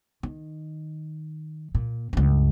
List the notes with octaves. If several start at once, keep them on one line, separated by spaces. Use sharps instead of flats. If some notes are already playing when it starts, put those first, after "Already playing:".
D#3
A#2
C#2 G2